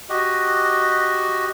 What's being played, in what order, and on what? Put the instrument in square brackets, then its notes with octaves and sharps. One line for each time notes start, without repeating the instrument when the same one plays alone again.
[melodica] F#4 G4 D#5